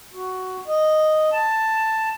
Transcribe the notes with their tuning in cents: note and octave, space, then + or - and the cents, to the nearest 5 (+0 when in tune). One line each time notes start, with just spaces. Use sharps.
F#4 +10
D#5 -5
A5 +5